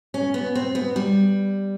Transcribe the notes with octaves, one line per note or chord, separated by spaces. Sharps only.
C#4
B3
C4
B3
G3